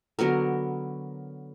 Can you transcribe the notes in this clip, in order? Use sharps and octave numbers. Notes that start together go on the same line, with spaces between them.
D3 F#3 B3 A#4